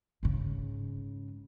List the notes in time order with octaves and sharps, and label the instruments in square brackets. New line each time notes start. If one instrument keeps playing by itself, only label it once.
[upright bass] G#2 C#3